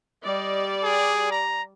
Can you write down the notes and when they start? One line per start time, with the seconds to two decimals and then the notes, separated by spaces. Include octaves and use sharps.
0.24 G3 D5 D#5
0.84 G#4
1.32 A#5